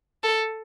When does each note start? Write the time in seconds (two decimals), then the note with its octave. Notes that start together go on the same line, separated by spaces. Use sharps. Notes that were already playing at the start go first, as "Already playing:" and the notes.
0.24 A4